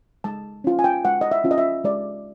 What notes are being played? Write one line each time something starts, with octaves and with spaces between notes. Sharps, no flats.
G#3 A5
C#4 F4
G#5
G5
G#3 F#5
D#5
E5
C#4 F4
D#5
E5
G#3 D5